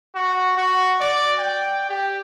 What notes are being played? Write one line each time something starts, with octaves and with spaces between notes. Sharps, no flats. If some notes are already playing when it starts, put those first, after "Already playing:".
F#4
F#4
D5
G5
G4